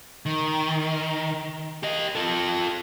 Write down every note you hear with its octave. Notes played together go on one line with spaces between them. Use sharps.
D#3
G4 D#5
F4 A4